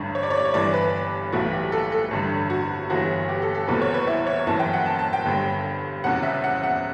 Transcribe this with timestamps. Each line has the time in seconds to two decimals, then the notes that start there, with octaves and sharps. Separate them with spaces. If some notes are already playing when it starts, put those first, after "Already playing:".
Already playing: A1 G2 D3
0.15 C#5
0.23 D5
0.30 C#5
0.37 D5
0.45 C#5
0.54 G1 G2 E3 D5
0.74 B4
1.32 B1 A2 E3 F#4
1.53 G4
1.72 A4
1.92 A4
2.11 A1 G2 D3
2.50 F#4
2.90 G1 G2 E3 F#4
3.29 G4
3.42 A4
3.55 A4
3.68 F#1 E2 B2 B4
3.82 C#5
3.94 B4
4.07 E4
4.27 C#5
4.46 G1 F#2 E3 A5
4.59 G5
4.73 F#5
4.86 A5
4.99 A5
5.13 G5
5.25 G1 G2 D3
6.04 E1 E2 C#3 F#5
6.23 E5
6.44 F#5
6.63 F#5